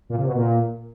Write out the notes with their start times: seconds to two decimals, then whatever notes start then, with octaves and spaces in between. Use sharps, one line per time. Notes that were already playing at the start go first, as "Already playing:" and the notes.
0.10 A#2
0.18 C3
0.26 B2
0.35 A#2